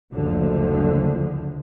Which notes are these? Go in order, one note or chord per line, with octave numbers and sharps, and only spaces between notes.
F#1 D2 D3 F3